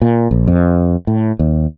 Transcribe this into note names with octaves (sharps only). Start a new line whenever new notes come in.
A#2
A#1
F2
A2
D#2